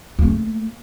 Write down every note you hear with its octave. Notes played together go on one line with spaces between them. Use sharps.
A3 A#3